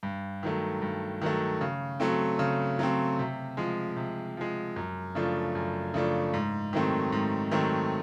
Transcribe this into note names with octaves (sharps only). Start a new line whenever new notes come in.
G2
D#3 F#3 A3
G2
D#3 F#3 A3
C#3
F#3 A3 C4
C#3
F#3 A3 C4
C3
F3 G#3
C3
F3 G#3
F#2
C#3 F3 A3 D4
F#2
C#3 F3 A3 D4
G#2
D#3 F#3 A3 C4
G#2
D#3 F#3 A3 C4